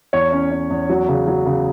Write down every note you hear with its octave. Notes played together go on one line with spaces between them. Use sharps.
E2 C#5
C#4
C#4
E2
F#3
C#3
F#3
C#3